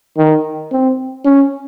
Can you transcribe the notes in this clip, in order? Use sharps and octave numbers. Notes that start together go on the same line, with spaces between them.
D#3
C4
C#4